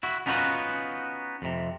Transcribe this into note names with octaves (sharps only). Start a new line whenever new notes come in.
E4 F#4
B3 C#4 D#4 F4 F#4 B4
F2 C3